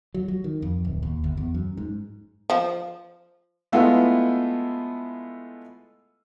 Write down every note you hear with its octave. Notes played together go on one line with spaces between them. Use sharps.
F#3
F#3
D#3
F2
D1
D#2
G1
E2
F#2
G#2
F3
G#3 A3 B3 E4 F4